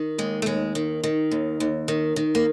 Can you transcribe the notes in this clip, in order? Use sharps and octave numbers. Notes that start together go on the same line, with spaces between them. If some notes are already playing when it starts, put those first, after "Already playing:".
Already playing: D#3
D#2 G#3
A3
D#2 G#3
D#3
D#3
D#2
D#2
D#3
D#3
A#3